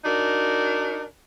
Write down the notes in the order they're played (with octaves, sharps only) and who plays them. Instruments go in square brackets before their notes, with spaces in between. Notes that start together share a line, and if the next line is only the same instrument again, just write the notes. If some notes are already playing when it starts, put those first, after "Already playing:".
[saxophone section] D4 D#4 F#4 A#4